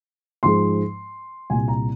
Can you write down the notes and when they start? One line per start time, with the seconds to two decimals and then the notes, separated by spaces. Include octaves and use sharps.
0.43 G#2 F3 G#3 C6
1.50 C2 A#2 G3 G#5
1.68 A#5